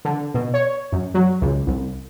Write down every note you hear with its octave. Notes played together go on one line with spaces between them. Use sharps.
D3
B2
C#5
F#2
F#3
C#2
C2